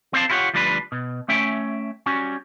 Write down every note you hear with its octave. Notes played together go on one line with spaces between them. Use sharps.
C4 A4 C5 F5 F#5 A5
E4 F4 G4 C#5 F#5
D2 F3 G3 D4 F4 B4
B2
A3 C#4 E5 G5
G3 C#4 F#4